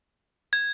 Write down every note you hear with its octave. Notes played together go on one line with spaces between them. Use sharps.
G#6